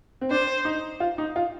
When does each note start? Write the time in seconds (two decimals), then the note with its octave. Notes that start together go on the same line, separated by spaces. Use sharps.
0.21 C4
0.31 D4 C5
0.65 D#4
1.00 F4
1.18 D#4
1.36 F4